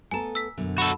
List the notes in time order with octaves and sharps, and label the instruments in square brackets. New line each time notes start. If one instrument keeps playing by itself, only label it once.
[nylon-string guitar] A3 B3 A4 [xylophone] G#5 A#5
[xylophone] E6 B6
[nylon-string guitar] F#2 B2 D3
[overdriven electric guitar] F#4 A4 [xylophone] B5 E7